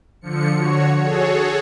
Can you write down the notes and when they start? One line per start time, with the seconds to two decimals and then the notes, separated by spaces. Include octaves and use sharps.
0.21 D3 F3 C#7
0.57 D3 F#4 C#5
1.00 F#4 G#4 A4 C#5